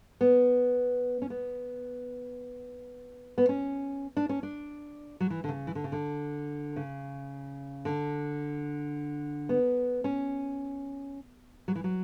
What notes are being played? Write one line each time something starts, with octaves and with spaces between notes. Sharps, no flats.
B3
C#4
B3
B3
C#4
D4
C#4
D4
F#3
E3
D3
C#3
E3
D3
C#3
D3
C#3
D3
B3
C#4
F#3
E3
F#3